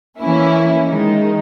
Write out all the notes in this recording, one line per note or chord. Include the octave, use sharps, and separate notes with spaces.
E3 A#3 C#4 E4
D#3 G#3 D#4